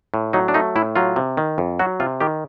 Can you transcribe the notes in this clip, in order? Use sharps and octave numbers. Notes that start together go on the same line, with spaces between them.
A2
F#3 D#4
D4
A3 D#4
A2 E4
F#3 F4
C3
D#3
F2
F#3 F#4
C3 F4
D#3 G4